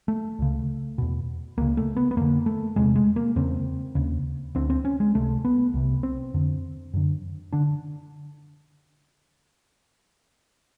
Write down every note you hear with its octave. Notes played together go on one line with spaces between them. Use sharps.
A3
C#2 C#3
E2 B2
C#2 C#3 A#3
A3
B3
B3
F2 D3 A#3
A3
E2 C3 G#3
G#3
A#3
E2 C#3 C4
D#2 C#3
D2 D3 C4
C4
C#4
G#3
C#2 C3 A3
B3
C2 C3
C4
F2 D3
F#2 D3
D3 D4